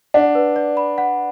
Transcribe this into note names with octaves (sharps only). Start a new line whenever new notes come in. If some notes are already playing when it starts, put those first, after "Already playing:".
D4 F#5
B4
D5
B5
F#5